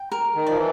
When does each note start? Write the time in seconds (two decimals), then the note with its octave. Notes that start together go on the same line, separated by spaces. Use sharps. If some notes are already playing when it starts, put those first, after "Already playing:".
Already playing: G5
0.12 A#4
0.35 D#3
0.47 F3 D5
0.57 E3